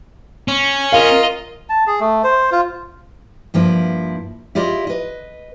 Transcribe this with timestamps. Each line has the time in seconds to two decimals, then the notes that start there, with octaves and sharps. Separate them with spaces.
0.48 C#4
0.92 F4 A#4 D#5 F5
1.69 A5
1.87 G#4
2.00 A3
2.24 C5
2.52 F4
3.54 G2 F3 A#3 E4
4.55 E4 F4 G4 D5 D#5
4.87 B4 D#5